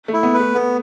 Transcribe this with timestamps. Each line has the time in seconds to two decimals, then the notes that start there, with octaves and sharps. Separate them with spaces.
0.08 A3
0.13 E4
0.23 B3
0.34 B4
0.40 A3
0.54 A3 B3